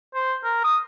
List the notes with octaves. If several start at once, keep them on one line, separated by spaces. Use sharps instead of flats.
C5
A#4
D#6